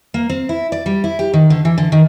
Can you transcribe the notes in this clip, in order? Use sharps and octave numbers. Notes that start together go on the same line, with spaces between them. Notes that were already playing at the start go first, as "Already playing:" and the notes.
A#3
C4
E4
D5
G3
E4
G4
D#3
D3
E3
D3
D#3